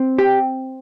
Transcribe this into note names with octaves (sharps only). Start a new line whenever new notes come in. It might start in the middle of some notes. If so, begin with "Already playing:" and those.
Already playing: C4
G4